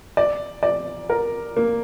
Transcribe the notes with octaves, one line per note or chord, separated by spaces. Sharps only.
D5
D5
A#4
A#3